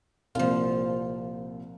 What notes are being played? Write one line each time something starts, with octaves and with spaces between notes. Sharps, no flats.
C2 A#2 F3 F4